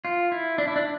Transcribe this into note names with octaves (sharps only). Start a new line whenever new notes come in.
F4
E4
D4
E4
D4